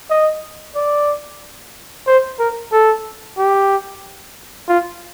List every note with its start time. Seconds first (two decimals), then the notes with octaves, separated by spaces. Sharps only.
0.10 D#5
0.76 D5
2.07 C5
2.39 A#4
2.73 A4
3.37 G4
4.68 F4